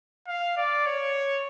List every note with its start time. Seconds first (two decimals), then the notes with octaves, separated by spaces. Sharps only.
0.27 F5
0.57 D5
0.86 C#5